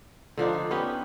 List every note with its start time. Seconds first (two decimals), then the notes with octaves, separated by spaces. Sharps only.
0.37 D3 F3 D4 D#4
0.71 B3 C#4 G4